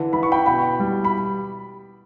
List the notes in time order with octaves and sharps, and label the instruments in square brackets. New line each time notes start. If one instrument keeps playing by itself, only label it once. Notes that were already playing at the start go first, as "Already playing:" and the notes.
Already playing: [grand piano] D3 E3
E3 B5
C#6
G5 B5
B2 G5 B5
G3
B5